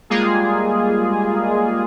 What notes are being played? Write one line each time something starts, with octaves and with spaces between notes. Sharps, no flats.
G3 G#3 A#3 F4 G#4